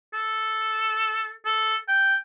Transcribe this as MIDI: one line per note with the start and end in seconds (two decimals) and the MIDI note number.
0.14 1.32 69
1.45 1.76 69
1.88 2.15 79